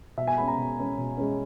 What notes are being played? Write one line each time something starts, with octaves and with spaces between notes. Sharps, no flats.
B2 E5
G#5
G#3 C#4 B5
A#5
B2
G#3 C#4
B2
G#3 C#4